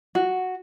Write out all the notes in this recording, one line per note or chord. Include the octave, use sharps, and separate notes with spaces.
F#4